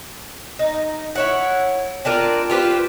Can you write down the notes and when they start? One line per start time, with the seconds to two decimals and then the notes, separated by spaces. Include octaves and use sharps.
0.59 D#4
1.15 E4 C#5 F#5
2.05 C4 D4 F4 A#4
2.50 F4 G4 B4 C5